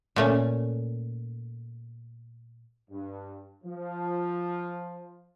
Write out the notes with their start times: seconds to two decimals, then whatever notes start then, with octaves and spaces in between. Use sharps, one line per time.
0.16 A#2 A3 C#4
2.90 G2
3.64 F3